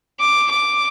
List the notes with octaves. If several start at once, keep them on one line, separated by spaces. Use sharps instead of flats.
D6
D6